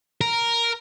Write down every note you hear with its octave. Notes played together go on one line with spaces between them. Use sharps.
A#4